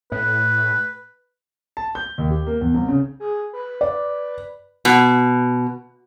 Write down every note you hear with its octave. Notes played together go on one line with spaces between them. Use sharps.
A2 B4
A5
G6
D#2
G4
A#3
E2
C2
C#3
G#4
B4
D5
B2